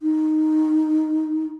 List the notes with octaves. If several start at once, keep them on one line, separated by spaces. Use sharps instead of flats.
D#4